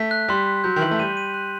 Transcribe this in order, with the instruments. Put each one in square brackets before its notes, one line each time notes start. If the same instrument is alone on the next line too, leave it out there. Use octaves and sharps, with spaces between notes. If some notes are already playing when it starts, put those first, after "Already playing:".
Already playing: [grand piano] A3 [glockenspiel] B6
[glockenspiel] F#6
[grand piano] G3 [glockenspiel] C6
[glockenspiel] F#6
[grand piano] F#3 [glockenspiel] G6
[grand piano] D#3
[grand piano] E3 [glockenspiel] F#7
[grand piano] A3
[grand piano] G3 [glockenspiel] D#7
[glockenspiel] D#7
F#6